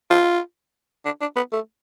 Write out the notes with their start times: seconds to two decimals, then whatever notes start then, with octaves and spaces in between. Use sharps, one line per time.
0.10 F4
1.05 D4
1.21 D4
1.36 B3
1.52 A3